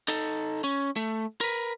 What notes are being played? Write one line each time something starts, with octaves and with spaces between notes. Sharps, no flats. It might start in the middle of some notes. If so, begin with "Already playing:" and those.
D#4 A4
C#4
A3
A#4 B4